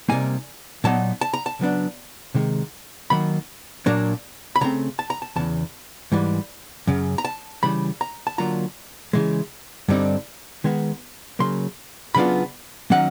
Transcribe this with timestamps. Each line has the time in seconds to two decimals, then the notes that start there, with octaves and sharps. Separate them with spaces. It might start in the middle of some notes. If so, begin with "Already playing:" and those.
0.09 C3 D#3 G3 A#3 D#4 G#5
0.84 A#2 F#3 B3 D#4 A5
1.21 A5
1.33 A#5
1.46 A5
1.59 C#3 F#3 B3 D4
2.35 C3 D#3 G#3
3.10 D#3 F#3 A#3 B5
3.86 A#2 F#3 A#3 D4
4.56 B5
4.61 C#3 E3 A3 C4 A#5
4.99 A5
5.10 A#5
5.22 A5
5.36 E2 C#3 E3 A5
6.12 G#2 E3 G3
6.87 F#2 C#3
7.18 A#5
7.25 A5
7.63 C#3 E3 G3 B5
8.01 A#5
8.27 A5
8.38 D3 F#3 A#3 D4 F4 A#5
9.13 C#3 E3 G#3
9.89 G2 D3 G3 C4 D#4
10.64 D#3 G#3 B3
11.39 C#3 F#3 A#3 C6
12.15 C#3 F#3 B3 D4 F4 B5
12.90 D#3 F#3 A#3 C#4 F#5